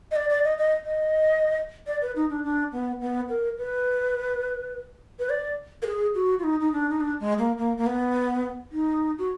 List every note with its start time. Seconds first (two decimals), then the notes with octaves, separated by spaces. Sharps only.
0.11 D#5
0.16 D5
0.30 D5
0.44 D#5
0.58 D#5
0.85 D#5
1.87 D5
2.02 B4
2.16 D#4
2.30 D4
2.44 D4
2.72 B3
3.01 B3
3.29 A#4
3.58 B4
5.19 B4
5.30 D5
5.82 A#4
5.87 G#4
6.15 F#4
6.39 F4
6.44 D#4
6.60 D#4
6.72 D4
6.89 D#4
7.01 D4
7.20 G#3
7.39 A#3
7.58 A#3
7.77 A#3
7.86 B3
8.72 D#4
9.18 F#4